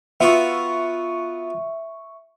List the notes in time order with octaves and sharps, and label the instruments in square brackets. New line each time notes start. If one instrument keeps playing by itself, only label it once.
[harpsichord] B3 F4 F#4 [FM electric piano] E5 C#6